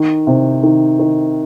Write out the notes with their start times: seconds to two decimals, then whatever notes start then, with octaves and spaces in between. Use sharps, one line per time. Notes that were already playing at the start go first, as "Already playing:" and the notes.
Already playing: D#3
0.27 C3
0.63 D#3
0.99 D#3